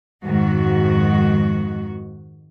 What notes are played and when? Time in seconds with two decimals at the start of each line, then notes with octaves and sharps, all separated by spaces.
0.23 F2 G#2 D#3 F#4